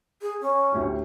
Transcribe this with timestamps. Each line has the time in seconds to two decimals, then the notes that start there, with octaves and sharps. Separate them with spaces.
0.22 G#4
0.41 C#4
0.72 D2 A2 G4